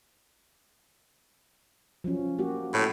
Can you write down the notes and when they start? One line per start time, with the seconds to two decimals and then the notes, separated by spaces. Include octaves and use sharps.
2.04 F3 F#3 C#4
2.39 A#3 F#4 G4
2.74 A2